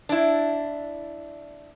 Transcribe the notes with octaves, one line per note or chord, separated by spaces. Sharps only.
D4 E4